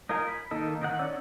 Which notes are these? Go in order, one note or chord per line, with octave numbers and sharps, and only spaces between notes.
D#4 F4 A#4 F5 G#5
B5
D#3 A#3 D#4 A4
D#3 D#4 F#5
C#4 D#4 D5 D6 E6